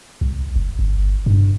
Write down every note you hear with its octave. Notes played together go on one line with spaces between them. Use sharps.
C2
F#1
G1
G2